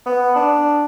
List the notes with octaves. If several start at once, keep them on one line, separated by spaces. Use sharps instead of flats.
B3
D4